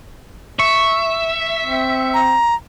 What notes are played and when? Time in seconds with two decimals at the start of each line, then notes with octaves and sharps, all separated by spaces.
0.59 E5 C#6
1.64 C4
2.14 A#5